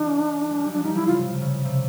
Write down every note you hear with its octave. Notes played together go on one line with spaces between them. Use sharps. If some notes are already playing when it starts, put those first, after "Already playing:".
Already playing: E3 D4
G#3
G3
F#3
F3 D4
G3 D#4
F3 E4
C#3 F4
C3
C3
C#3
C3